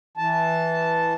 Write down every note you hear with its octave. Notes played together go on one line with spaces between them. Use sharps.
E3 A5